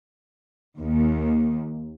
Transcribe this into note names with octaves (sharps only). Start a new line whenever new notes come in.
D#2